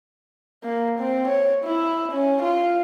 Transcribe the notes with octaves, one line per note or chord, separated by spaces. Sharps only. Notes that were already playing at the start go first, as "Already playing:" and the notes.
A#3
C4
C#5
E4
C#4
F4